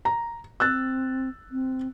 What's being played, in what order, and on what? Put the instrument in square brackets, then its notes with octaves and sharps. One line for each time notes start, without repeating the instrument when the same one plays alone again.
[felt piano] A#5
[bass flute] C4 [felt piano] E6 F#6 A6
[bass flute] C4